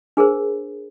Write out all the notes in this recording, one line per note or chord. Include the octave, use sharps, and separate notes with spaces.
D4 G#4 A#4 C5